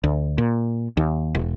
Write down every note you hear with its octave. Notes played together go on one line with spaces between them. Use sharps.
D2
A#2
D#2
E1